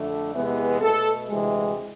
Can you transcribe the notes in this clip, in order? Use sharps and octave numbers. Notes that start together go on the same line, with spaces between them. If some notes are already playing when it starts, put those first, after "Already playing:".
Already playing: F2 D3 A3
E2 C3 E3 G#3 B3
B2 A3 A4
D2 C3 E3 G#3